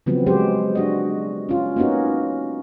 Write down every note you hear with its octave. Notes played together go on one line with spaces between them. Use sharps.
C#3 F3 F#3 B3 C4
F#3 G#3 G4 C5
D4 F#4 D#5
C#4 F4
A#3 B3 C#4 D#4 F#4